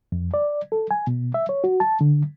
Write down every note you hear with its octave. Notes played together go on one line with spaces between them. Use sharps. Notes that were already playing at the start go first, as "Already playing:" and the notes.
F2
D5
A4
G#5
B2
E5
C#5
F#4
A5
D3